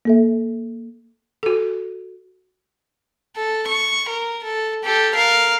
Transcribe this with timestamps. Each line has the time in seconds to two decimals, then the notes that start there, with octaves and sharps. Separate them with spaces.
0.05 A#3 A4 E5
1.43 F#4 A4
3.36 A4
3.67 C#6
4.08 A#4
4.44 A4
4.84 G4 A4
5.15 A#4 F5